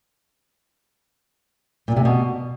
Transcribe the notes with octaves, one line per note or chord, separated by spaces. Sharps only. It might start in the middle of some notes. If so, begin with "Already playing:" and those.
A#2
C3
B2